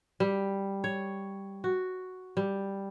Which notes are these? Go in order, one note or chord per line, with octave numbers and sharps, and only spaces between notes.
G3
C#5
F#4
G3